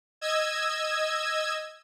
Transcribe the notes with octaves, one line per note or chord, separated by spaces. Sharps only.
D#5 E6 G#6